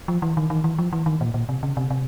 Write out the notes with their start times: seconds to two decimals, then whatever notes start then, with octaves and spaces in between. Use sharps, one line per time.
0.08 F3
0.22 E3
0.37 D#3
0.50 D#3
0.64 E3
0.79 F3
0.93 E3
1.06 D#3
1.21 A#2
1.34 A#2
1.49 C3
1.63 C#3
1.77 C3
1.91 C3